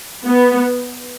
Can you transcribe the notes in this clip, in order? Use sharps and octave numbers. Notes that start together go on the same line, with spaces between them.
B3